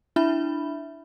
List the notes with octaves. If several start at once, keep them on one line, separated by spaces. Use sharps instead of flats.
D4 E4 E5 B5